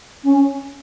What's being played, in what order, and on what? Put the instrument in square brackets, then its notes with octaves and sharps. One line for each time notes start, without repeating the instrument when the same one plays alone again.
[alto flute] C#4